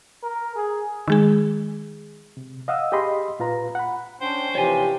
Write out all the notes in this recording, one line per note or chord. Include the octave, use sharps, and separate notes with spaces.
A#4
G#4
D#3 G#3 G#4
C3
D#5 F5 F#5 D#6 E6
G4 G#4 D#5 B5 C6
A#2 F4 B4 A#5
F#5 B5
C#4 D4 C5 G5
C3 E3 F3 G4 C#5 D5 G#5